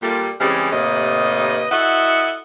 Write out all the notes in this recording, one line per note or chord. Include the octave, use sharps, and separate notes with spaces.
A#2 G3 A4
C#3 E3 G3 G#3 C4
D#2 A2 C3 D#4 B4 D#5
E4 F#4 A4 D#5 F#5